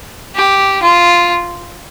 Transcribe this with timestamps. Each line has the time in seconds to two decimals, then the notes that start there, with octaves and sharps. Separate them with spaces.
0.36 G4
0.83 F4